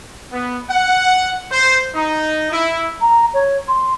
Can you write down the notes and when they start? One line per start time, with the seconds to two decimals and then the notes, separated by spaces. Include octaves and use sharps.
0.32 B3
0.70 F#5
1.51 C5
1.94 D#4
2.52 E4
3.01 A#5
3.34 C#5
3.68 C6